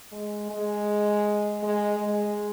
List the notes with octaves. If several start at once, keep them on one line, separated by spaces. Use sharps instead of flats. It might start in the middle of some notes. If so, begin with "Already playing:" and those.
G#3
G#3
G#3
G#3